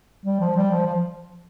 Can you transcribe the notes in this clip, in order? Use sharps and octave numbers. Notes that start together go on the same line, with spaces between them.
G3
F3
G3
F3
F3